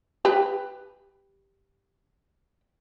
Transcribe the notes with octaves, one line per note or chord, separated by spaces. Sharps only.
G4 B4